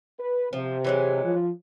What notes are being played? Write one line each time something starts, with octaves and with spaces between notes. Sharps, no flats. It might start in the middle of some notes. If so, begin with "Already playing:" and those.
B4
C3 F3
E3 F#3 G#3
F3